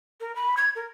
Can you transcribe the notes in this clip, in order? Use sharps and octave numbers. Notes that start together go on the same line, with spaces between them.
A#4
B5
G#6
A#4